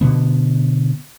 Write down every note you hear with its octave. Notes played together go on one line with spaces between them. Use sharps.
B2 D3 B3